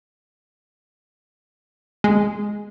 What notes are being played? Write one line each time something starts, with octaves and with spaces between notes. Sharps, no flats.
G#3